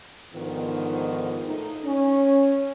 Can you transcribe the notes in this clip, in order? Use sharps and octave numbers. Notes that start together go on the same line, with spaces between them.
G#2 D3 D#3 F3 B3
A2 D#4
C#4